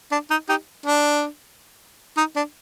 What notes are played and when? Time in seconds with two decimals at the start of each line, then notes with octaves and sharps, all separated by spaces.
0.12 D4
0.30 D#4
0.49 D#4 G4
0.86 D4
2.17 D#4
2.36 D4